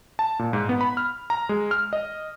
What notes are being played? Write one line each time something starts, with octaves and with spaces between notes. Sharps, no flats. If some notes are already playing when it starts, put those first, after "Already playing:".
A5
A#2
G#2
B3
B5
F6
A#5
G#3
F6
D#5